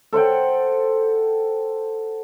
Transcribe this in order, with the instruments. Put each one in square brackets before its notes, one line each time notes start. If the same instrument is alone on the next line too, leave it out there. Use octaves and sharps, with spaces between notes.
[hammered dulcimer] A4 C5 F#5 G5